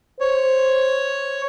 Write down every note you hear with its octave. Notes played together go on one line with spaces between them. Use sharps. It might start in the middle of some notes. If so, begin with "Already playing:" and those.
C5 C#5